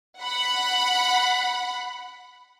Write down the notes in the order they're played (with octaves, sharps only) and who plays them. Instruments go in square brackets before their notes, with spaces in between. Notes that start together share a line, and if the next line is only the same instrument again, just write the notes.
[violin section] F#5 B5